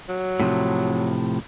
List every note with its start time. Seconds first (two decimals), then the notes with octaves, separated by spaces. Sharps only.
0.09 F#3
0.40 A2 C3 F3